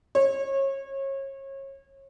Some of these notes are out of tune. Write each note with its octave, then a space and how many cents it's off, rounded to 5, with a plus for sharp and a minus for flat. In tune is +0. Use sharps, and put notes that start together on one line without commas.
C#5 -30